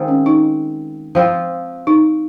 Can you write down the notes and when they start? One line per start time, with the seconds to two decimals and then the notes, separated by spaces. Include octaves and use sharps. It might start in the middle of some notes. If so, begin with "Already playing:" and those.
Already playing: D#3 G#3 C4 F4
0.08 C#4
0.26 D#4
1.15 F3 C4 F4
1.87 D#4